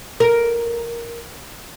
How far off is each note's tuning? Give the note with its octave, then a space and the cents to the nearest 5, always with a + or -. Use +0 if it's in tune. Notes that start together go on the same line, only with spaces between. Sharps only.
A#4 +5